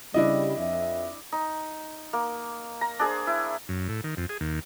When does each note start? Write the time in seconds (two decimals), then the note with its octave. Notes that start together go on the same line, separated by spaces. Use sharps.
0.14 C#3 G3 D4 E4 D#5
0.58 F2 E5
1.32 D#4
2.13 A#3
2.81 A#5
2.99 D4 G#4 C5
3.27 E4
3.69 F#2
3.89 A2
4.04 D#3
4.17 F2
4.29 G#4
4.41 D#2